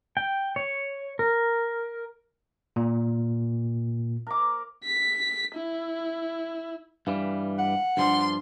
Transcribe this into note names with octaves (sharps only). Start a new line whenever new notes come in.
G5
C#5
A#4
A#2
A#4 D6
B6
E4
G2 E3 G3 F5
F#5
G2 F3 G3 D4 C6